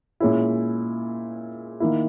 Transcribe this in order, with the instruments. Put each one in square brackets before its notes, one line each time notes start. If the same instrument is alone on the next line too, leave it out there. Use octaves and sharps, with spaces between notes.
[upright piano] A#2 G#3 C#4 E4
D#3 A#3 E4